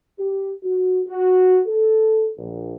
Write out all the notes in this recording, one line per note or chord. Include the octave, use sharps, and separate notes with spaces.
G4
F#4
F#4
A4
A#1